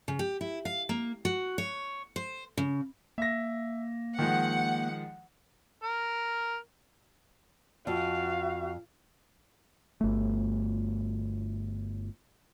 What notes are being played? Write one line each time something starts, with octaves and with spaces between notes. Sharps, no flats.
C#3
G4
E4
F5
A#3
F#4
C#5
C5
C#3
A#3 E5 A#6
D#3 F3 G#3 F#5
A#4
F2 F#4 F5
G1 A3